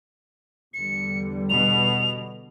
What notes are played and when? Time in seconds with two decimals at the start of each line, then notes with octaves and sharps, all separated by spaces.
0.74 E2 D3 G3 C#7
1.50 B2 F7